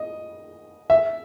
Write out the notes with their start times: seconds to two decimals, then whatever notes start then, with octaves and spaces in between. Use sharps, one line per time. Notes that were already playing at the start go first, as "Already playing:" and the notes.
Already playing: D#5
0.90 E5